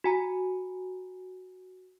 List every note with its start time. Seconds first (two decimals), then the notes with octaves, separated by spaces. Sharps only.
0.04 F#4 G#5 A#5